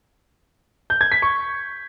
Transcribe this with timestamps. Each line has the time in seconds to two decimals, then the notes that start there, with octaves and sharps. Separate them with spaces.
0.90 G6
1.01 G#6
1.12 B6
1.22 C#6